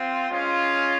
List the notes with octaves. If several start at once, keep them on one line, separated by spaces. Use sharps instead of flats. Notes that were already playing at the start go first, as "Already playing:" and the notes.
Already playing: C4 F4
G#3 C#4 F4